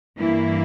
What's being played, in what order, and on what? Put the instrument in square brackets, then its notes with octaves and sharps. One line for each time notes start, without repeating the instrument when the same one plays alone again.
[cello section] G2 E3 A#3 E4